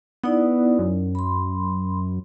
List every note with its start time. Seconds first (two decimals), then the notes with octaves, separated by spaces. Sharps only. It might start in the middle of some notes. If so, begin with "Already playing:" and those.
0.24 B3 D#4 E4 D5
0.79 F#2
1.15 B5 C6